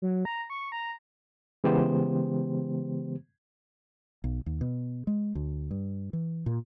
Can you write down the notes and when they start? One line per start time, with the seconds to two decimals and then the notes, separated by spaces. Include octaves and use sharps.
0.02 F#3
0.25 A#5
0.50 C#6
0.72 A#5
1.64 C#3 E3 G#3 B3 G4 C5
4.24 B1
4.46 D#2
4.61 B2
5.07 G#3
5.35 D2
5.71 G2
6.13 E3
6.46 A#2